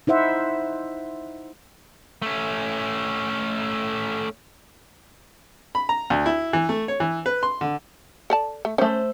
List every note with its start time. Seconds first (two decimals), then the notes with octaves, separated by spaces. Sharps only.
0.07 D#4 E4 C5 E5 F#5
2.22 A3 C#4
5.75 B5
5.89 A#5
6.10 D2
6.26 E4
6.53 E3
6.69 A3
6.88 C#5
7.00 E3
7.26 B4
7.43 C6
7.61 D3
8.30 A4 D5 A5
8.65 A3
8.78 A3 C#4 C5